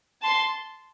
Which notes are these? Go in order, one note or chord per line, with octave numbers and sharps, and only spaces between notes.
A5 C6